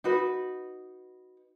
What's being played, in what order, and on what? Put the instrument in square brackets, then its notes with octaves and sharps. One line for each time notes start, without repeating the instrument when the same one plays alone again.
[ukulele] D#4 F#4 B4